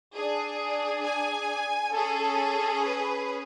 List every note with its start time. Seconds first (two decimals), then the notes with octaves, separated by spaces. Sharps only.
0.15 D4 G#4
1.05 G#5
1.94 C#4 G#4 A4
2.84 B4